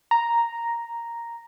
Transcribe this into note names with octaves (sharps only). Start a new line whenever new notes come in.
A#5